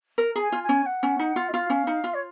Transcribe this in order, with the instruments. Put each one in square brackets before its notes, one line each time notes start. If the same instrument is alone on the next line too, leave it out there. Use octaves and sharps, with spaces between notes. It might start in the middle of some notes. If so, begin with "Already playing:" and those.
[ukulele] A#4
[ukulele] G#4 [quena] A#5
[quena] G#5
[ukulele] F4
[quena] G#5
[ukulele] C#4
[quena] F#5
[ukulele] C#4
D#4
F4
[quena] D#5
[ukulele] F4 [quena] F5
[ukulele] C#4
D#4
F4
[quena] C#5